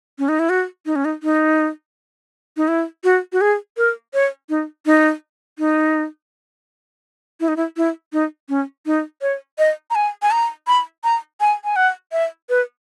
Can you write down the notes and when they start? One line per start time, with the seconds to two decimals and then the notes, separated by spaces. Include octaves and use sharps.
0.19 C#4
0.29 D#4
0.39 E4
0.50 F#4
0.86 D#4
0.96 C#4
1.05 D#4
1.23 D#4
2.57 D#4
2.68 E4
3.04 F#4
3.33 F#4
3.41 G#4
3.77 A#4
4.14 C#5
4.49 D#4
4.86 D#4
5.59 D#4
7.40 E4
7.48 D#4
7.57 E4
7.77 E4
8.13 D#4
8.49 C#4
8.86 D#4
9.22 C#5
9.59 D#5
9.90 A#5
9.95 G#5
10.22 G#5
10.31 A#5
10.67 B5
11.04 A#5
11.41 G#5
11.64 G#5
11.76 F#5
12.12 E5
12.49 B4